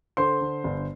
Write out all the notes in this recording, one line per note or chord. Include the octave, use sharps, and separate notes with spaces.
D3 C5 C6
D3
G1